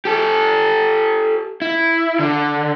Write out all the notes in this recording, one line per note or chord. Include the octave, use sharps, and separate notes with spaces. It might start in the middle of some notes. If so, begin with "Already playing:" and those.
G4 A4
E4
D3